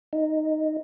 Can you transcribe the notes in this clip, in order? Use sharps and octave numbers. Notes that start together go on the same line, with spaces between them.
D#4